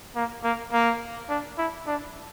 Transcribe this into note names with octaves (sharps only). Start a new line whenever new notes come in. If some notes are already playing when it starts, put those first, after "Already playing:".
A#3
A#3
A#3
D4
E4
D4